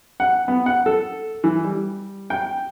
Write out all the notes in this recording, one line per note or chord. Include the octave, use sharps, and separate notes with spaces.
F#5
B3
F#5
A4
E3
G3
G5